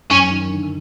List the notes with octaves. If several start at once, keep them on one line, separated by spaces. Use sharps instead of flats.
F#2 C#4
D#3
D3